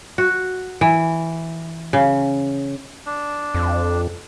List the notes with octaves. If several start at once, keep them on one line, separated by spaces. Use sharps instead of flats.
F#4
E3
C#3
D4
F2